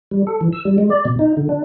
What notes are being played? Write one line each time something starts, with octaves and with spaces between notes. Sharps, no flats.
G3
A4
E3
E6
G3
G#3
D5
B2
D#4
D3
D4